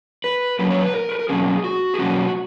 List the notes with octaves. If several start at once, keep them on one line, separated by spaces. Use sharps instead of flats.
B4
A#2 F#3 A#3 C#4 B4
C#5
B4
A#4
B4
A#4
B2 F#3 A#3 C#4 G#4
F#4
G#4
B2 F#3 A#3 C#4 F#4